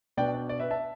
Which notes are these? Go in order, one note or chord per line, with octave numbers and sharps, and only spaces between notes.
B2 B3 D4 D5 G5
D5
D5
B4 E5
E5 A5